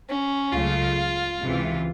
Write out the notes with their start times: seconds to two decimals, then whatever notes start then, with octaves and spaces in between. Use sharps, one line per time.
0.09 C#4
0.53 C#2 C#3 F#3 A3 F4
1.40 C#2 C3 E3